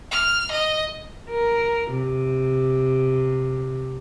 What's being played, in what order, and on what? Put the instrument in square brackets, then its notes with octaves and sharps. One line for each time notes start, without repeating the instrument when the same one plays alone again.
[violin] F6
D#5
[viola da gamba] A#4
C3